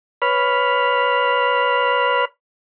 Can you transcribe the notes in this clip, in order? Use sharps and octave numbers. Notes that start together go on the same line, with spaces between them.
B4 C#5 B5 F6